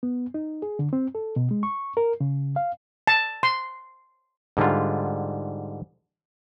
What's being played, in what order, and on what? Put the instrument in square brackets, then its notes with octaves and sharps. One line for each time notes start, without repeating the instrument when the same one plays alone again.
[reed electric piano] B3
D#4
G#4
D3
C4
A4
B2
G#3
C#6
A#4
C#3
F5
[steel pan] A5
C6
[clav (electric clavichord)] G#2 D3 G3 F4